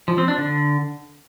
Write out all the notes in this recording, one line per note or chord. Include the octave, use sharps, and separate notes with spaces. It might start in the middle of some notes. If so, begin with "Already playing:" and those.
F3
C4
D4
D3